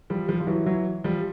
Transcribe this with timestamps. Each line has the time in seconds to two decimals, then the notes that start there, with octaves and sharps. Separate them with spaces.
0.10 F3 G3
0.28 F3 G3
0.40 F3
0.47 E3 F#3
0.66 E3 F#3
1.04 F3 G3